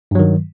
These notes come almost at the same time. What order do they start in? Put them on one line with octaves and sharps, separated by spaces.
G2 F#3 D#3